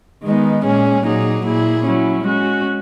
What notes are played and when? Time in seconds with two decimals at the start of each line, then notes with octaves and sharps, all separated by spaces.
0.23 D#3 G#3 B3 D#4
0.63 A#2 G#3 C#4 G#4
1.04 A#2 F#3 A#3 D#4 G#4
1.44 A#2 A#3 E4 G#4
1.84 F#3 C#4 E4
2.25 G#3 C#4 F#4